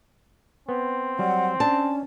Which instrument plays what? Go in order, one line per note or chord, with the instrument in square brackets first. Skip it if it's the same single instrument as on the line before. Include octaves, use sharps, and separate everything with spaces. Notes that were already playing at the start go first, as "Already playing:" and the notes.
[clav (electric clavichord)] B3 [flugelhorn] C4
[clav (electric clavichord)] F#3 G3 [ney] F#5
[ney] C#4 [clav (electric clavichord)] D4 [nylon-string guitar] A5